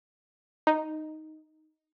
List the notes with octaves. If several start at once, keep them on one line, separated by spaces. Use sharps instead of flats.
D#4